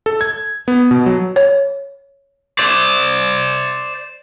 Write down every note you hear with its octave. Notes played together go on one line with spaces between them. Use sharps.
A4
G#6
B3
B2
F#3
C#5
C5 D5